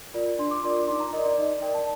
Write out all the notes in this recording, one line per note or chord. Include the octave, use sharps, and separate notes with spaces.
F4 A#4 D5
D4 C6
D6
F4 A#4 D5 C6
D6
D#4 C6
A#5
A#4 D5 D#5
D5
D#4 D#5
A#4 D5 G5
A5